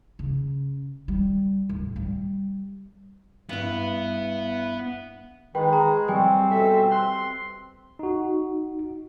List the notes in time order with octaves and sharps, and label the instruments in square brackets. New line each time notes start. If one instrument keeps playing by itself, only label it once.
[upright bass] C#3
G3
D1
G3
[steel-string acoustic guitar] G2 E4 [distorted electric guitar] B3
[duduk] D#3 [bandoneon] G#3 [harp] B4 [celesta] G5
[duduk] G#4 [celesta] A#5
[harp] G3 C#6 [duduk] C4 [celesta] G5 G#5
[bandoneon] B2 A4 E5
[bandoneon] C6 [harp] F#6
[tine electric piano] D#4 F#4